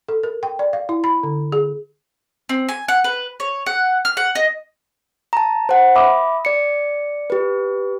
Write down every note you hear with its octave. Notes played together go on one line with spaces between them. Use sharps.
A4
A#4
G5
D5
F5
E4
B5
D3
G#4
C4
G#5
F#5
B4
C#5
F#5
F6
F#5
D#5
A5 A#5
C5 F#5
E5 B5 D6 D#6
D5 C#7
G4 B4